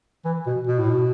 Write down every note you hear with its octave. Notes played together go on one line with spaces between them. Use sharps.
E3
B2
B2
A2
B2